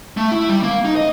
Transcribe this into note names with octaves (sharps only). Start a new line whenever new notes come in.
A3
E4
G3
A#3
D#4
D#5